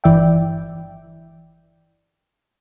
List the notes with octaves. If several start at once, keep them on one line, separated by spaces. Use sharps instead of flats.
G1 E3 D5 E5 G5